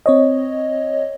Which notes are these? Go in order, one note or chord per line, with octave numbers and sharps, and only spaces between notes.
C4 C#5 D#5